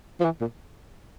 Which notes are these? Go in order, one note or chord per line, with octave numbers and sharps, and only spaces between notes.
F3
E3
A#2